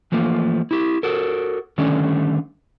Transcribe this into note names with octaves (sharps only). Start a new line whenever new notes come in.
E3 F3 A3 A#3
E4 G4
F#4 A4 A#4
D3 D#3 G3 A3 C#4